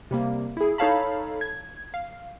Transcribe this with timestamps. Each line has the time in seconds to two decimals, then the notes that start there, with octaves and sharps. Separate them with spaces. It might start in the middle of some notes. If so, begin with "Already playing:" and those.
0.11 C3 G3 A#3
0.57 E4 G#4
0.78 D#4 A4 C#5 F5 A5 B5
1.41 G#6
1.94 F5